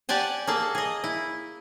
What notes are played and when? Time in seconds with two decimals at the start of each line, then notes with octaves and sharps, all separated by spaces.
0.09 G4 D5 F#5 G#5 A5
0.47 A#3 G#4 A4 A5
0.75 G#4 D#5
1.04 E4